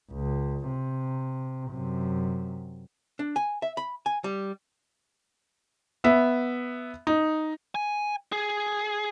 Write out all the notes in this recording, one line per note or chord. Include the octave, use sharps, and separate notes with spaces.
C#2
C3
F#2 C3
D4
G#5
E5
B5
G#5
G3
B3 E5
D#4
G#5
G#4